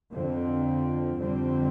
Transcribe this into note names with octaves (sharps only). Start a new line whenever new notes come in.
F2 D3 F3 C4
F2 D3 G3 C4